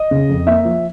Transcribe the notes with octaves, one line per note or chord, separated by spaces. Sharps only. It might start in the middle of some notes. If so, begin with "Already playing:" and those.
Already playing: D#5
C#3
F2
A#3 E5
F3